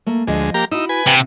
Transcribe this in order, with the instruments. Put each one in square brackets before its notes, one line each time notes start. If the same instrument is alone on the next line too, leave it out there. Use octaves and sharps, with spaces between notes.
[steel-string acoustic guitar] A3 A#3
[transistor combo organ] D2 G#3 [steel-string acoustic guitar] F3 D#5
[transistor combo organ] A#3 G4 A#5
[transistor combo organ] D#4 E6 [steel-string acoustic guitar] E4 F#4
[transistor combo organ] B4 G#5
[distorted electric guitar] C3 [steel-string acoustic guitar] F#5